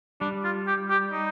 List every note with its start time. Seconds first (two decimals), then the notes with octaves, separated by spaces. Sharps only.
0.21 G3 D4
0.44 F4
0.67 G4
0.90 G4
1.12 D#4